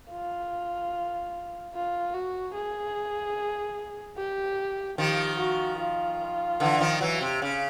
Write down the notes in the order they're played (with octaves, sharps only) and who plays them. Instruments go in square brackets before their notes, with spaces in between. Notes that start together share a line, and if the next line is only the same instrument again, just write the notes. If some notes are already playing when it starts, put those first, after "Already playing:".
[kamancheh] F4
F4
F#4
G#4
G4
[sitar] D#3 F3 [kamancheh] G4
[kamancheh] F#4
F4
[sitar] D3 E3
D#3 F3
E3 F#3
C3
C#3